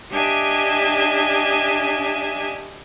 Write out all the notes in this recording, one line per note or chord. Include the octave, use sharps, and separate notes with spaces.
D4 G4 D#5 E5 G#5